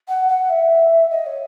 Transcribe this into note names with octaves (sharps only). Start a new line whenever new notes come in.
F#5
F#5
E5
D#5
C#5